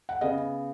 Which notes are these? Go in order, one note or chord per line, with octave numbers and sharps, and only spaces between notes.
F#5
C#3 B3 D#5